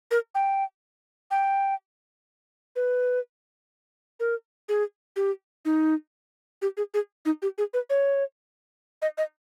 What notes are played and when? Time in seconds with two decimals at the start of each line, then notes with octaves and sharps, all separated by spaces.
0.11 A#4
0.35 G5
1.31 G5
2.76 B4
4.20 A#4
4.69 G#4
5.16 G4
5.65 D#4
6.62 G4
6.77 G#4
6.94 G#4
7.25 D#4
7.42 G4
7.58 G#4
7.74 B4
7.90 C#5
9.02 D#5
9.18 D#5